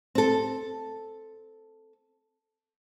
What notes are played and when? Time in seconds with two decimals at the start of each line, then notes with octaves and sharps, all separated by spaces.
0.15 C4 A4